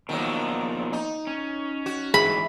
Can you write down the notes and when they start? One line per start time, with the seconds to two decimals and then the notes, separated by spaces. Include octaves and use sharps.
0.09 B2 D#3 F3 F#3 A#3
0.93 D#4
1.27 C#4
1.86 F#4
2.14 G#2 E3 G#4 E5 B5